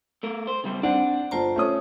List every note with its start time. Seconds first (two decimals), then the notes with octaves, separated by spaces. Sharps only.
0.23 A3 A#4
0.47 C5
0.64 C#3 G3
0.83 C4 D4 D5 F#5
1.31 G1 F4 C5 A5 A#5
1.56 A3 C#4 D#6